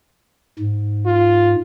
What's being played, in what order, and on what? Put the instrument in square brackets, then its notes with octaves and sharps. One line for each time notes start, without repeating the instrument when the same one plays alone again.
[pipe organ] G#2
[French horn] F4